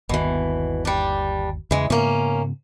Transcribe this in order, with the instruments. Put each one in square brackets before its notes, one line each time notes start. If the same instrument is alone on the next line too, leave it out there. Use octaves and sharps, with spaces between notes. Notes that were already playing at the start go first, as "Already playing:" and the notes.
[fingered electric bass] G1 D#2 D#3 [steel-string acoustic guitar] B2 E3
[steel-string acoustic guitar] G3 D4
[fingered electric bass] E2 C#3 [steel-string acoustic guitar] E3 G#3
[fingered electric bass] G#2 C#3 B3 [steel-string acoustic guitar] A#3 C#4